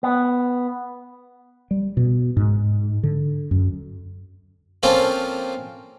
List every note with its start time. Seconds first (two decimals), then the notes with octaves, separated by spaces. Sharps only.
0.03 B3
1.71 G3
1.97 B2
2.37 G#2
3.03 D3
3.51 F#2
4.83 F3 A#3 C4 C#4 F4 A4